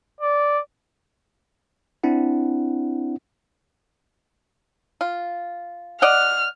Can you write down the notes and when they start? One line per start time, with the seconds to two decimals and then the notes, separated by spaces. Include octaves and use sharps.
0.21 D5
2.03 C4 D4 E4 F#5
5.01 F4
6.02 D5 D#5 F#5 F6